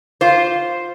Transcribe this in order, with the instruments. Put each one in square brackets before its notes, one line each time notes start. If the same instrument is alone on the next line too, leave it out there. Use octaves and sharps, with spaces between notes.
[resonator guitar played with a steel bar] F4 C5